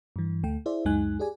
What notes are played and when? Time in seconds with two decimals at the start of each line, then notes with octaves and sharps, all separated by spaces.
0.16 G2 E3
0.43 D2 A3 G5
0.66 E4 G#4 C5 D5 E5
0.85 C#2 F#2 G#3 D#4 G#5 F#6
1.19 G4 G#4 D5 G#5